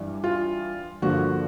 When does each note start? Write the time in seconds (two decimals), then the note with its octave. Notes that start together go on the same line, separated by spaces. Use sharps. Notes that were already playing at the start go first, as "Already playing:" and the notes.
Already playing: G2 E3 G3
0.24 F4
1.02 G2 D3 F3 A#3 F#4